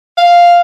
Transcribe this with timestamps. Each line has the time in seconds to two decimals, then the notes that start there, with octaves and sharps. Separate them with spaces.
0.18 F5